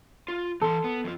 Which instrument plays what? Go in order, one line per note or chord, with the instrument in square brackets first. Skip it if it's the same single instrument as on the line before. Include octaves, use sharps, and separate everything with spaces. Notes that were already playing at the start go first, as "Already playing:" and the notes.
[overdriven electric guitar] F4
[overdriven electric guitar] E3 C6 [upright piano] A4
[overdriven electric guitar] B3
F2 F3